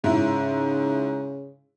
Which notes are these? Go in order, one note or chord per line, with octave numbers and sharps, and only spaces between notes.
G#2 C#3 E4